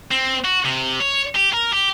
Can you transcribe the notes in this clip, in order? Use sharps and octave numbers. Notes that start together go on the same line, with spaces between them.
C4
F#4
C3
C#5
G4
A#4
G4